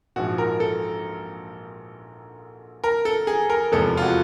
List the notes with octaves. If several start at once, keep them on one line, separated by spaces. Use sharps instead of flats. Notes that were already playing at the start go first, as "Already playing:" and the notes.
A#1 G#2 F3 F#4
A#4
A4
A#4
A4
G#4
A#4
F1 E2 C3 F3 G#3 A4
F4
F#4